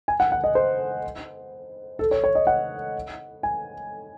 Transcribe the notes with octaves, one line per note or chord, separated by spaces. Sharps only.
G#5
F#5
F#5
D#5
C5
A4
C#5
C#5
D#5
F#5
G#5